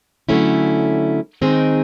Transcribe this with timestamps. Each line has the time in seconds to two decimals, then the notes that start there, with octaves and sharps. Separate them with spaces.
0.29 D3 F#3 A3 C#4 E4
1.42 D#3 G#3 C4 D#4 G#4